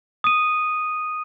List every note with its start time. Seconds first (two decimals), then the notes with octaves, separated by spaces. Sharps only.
0.24 D#6 D#7